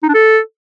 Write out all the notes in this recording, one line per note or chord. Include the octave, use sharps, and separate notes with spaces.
D#4
D4
A4